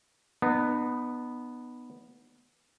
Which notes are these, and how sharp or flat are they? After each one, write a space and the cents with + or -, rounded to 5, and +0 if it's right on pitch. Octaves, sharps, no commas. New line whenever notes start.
B3 +0 D#4 -40